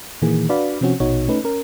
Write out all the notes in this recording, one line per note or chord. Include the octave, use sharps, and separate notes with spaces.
A#2 D#3 E3 A#3 G#4
D4 F#4 B4 D5 F5 B5
C3 F3 C4 C#4 F#4
A#1 B2 D#4 F#4 C#5
A3 C#4 D#4 B4
C#4 A#4